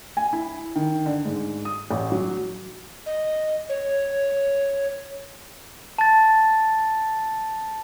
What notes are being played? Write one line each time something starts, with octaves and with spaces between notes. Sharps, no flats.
G#5
E4
D#3
D3
G#2
D#6
A1
F#3
D#5
C#5
A5 A6